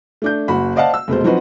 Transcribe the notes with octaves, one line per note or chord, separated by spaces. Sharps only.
A3 D4 G6
F#1 F#4 B5
C5 D5 D#5 F5 F#5 A5
E6
F1 B2 G#3 C5
F3 F#3 C4 D#4 F#4 B4